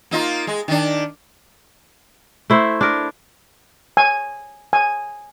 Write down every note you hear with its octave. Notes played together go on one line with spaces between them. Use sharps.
A#3 D#4 F4
G#3
D#3 D4
A3 E4 C5
D4 A#4
G#5
G#5